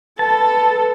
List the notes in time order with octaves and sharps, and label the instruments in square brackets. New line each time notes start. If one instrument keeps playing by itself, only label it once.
[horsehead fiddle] A4 [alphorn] B4 [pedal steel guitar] A5